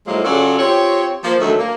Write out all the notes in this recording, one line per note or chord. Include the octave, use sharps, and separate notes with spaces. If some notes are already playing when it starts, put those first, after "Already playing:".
A2 F3 F#3 G#3 A#3
C#3 F#3 F4 F#4 A4 D5
C4 F4 G4 C#5
F3 A#3
D2 D#3 F#3 A3
A#3